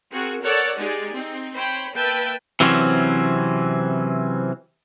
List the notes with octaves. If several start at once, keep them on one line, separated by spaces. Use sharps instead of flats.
C4 F#4 G#4 A#4
A4 A#4 C#5 D5 F#5 A5
G#3 D#4 G4 G#4 D5
C4 D#4
C5 C#5 G5 B5
A#3 B4 E5 G5 A5
C3 E3 F#3 C4 C#4